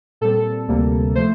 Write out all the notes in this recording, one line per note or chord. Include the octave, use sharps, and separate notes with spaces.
A#2 G3 C4 A4
D2 C3 G3 A#3
F3 A3 C5